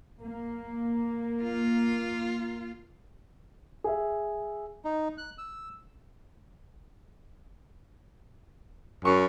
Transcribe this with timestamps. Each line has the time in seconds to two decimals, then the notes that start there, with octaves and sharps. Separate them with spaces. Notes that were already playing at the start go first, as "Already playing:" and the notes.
0.23 A#3
1.42 F4
3.84 G#4 E5
4.85 D#4
5.18 F#6
5.38 E6
9.05 F#2 C#6